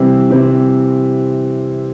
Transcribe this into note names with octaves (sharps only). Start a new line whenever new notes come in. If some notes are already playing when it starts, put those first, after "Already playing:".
Already playing: C3 E3 G3 C4 E4
C3 E3 G3 C4 E4